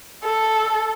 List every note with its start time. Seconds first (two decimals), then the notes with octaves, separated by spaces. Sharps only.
0.24 A4